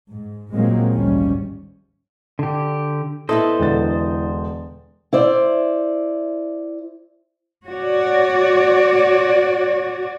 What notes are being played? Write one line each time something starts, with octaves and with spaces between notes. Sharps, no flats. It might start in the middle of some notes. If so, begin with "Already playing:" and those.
G#2
A#2 F3 F#3 G#3 A#3 C4
G#1 D2 D#3 F3 G3 C#4
D3 G4
B3 E4 A4 C5 D#5
E1 D3 A6
E4 C5 D5
F#4 C#5 D5